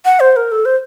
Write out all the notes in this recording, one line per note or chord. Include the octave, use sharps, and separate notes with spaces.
F#5
C5
A#4
A4
C5